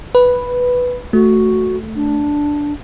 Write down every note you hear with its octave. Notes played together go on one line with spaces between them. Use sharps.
B4
A3 F#4
D4